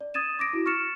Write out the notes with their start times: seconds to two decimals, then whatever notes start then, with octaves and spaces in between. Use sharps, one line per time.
0.01 D5
0.14 D#6 G#6 A6 D#7 E7
0.39 D6 A#6 D7
0.53 E4 F#4
0.66 C#6 F6 A6 C#7 E7